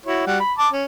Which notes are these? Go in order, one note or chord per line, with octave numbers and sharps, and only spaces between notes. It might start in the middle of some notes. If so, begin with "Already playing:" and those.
E4 F#4 C#5
G3 F#4 F#5
B5
A5 D6
C#4